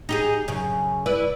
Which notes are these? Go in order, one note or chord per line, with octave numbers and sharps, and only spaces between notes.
D#4 G4 G#4
F#2 C#3
E4 B4 D5